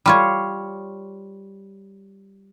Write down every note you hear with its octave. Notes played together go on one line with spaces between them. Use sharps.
G3 F4 C#5